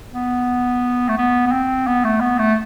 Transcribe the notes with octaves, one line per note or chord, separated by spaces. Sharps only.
B3
A3
B3
B3
C4
B3
A3
B3
A3